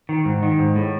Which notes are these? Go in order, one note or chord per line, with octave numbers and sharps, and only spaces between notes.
D#3
G#2
D#3
G#2
A2